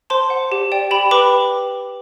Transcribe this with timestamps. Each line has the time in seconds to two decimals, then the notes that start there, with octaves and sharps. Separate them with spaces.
0.10 C5 A5 C6
0.30 F#5
0.52 G4
0.72 D5 G5
0.91 G4 G5 B5
1.11 B4 B5 D6